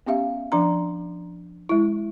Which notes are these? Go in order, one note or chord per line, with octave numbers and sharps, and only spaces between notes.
B3 C#4 G4 E5 F5
F3 D4 A#5
G#3 E4